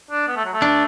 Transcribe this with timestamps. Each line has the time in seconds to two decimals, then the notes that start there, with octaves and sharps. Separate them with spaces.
0.11 D4
0.28 B3
0.36 A3
0.45 F#3
0.53 A3
0.62 D4